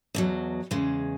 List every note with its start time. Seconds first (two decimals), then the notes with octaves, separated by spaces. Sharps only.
0.15 E2 B2 F#3
0.71 E2 C#3 G#3